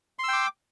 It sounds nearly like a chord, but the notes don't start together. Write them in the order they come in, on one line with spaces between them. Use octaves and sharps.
C6 E6 G5 D6